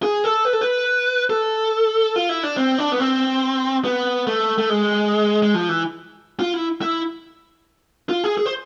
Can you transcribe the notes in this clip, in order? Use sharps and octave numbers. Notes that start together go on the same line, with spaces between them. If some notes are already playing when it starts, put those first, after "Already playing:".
G#4
A4
B4
A4
B4
A4
F4
E4
D4
C4
D4
B3
C4
B3
A3
A3
G#3
G#3
F3
E3
F4
E4
E4
F4
G#4
G#4
C5